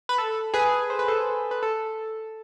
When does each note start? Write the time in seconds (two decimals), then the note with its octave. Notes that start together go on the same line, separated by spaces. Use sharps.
0.09 B4
0.18 A4
0.54 G#4 B4
0.90 C5
0.99 B4
1.08 A4 C5
1.51 B4
1.63 A4